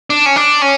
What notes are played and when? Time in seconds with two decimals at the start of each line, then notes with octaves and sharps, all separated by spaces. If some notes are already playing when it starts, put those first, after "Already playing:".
0.10 D4
0.26 C#4
0.36 D4
0.62 C#4